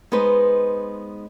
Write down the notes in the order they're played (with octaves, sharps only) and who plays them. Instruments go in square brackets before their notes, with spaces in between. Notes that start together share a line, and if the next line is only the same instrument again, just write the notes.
[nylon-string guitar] G#3 B3 D#4 B4 C5